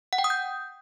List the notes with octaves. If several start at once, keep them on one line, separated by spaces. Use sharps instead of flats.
F#5
G5
D#6
G6